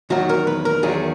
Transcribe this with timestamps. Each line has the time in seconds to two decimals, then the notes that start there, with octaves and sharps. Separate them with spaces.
0.10 E2 D#3 F#3 F#4
0.29 A#4
0.47 B4
0.65 A#4
0.83 E2 D#3 F#3 G#4